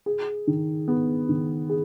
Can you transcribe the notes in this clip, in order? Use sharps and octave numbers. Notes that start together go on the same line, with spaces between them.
G#4
D#3
B3
D#3
G#4